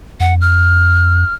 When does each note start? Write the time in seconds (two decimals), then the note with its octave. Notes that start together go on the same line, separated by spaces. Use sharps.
0.20 F2 F#5
0.41 F6